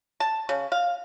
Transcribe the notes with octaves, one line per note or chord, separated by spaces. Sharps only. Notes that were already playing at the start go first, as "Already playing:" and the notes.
A5
C#3
F5